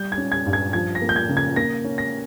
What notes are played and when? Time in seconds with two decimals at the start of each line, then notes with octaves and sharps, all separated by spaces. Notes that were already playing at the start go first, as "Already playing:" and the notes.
Already playing: G3 G6
0.12 G#6
0.18 C#4
0.32 G#6
0.46 G2
0.53 G#6
0.73 F3 G#6
0.95 A#6
1.02 A#3
1.09 G6
1.16 G#6
1.29 C#3
1.37 G#6
1.56 A#3 A#6
1.84 C#4
1.98 A#6